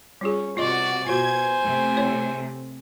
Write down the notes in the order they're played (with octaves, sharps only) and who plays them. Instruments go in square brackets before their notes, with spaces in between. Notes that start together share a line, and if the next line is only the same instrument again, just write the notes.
[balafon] G3 F4 G#4 [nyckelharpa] C#4
[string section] C3 F#4 [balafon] F4 D#5 C6 [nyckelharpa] D5
[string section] B2 G#6 [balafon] F4 F#4 [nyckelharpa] C5 G#5
[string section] C3 A3
[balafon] E4 C#5